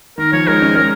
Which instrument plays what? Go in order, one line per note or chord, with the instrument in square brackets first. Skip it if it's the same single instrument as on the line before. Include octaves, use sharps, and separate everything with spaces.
[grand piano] D#3 [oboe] A#4
[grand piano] F3 [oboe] C#5
[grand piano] D#3 G#3 [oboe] A#4
[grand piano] G#3 C#4
[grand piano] G#3 C#4 [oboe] A#4